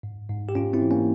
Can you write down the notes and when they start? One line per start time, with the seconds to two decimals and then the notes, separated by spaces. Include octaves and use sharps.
0.03 G#2
0.29 G#2
0.49 G4
0.55 G#2 C#4 F4
0.73 C4 E4
0.82 E3
0.91 A#3 C#4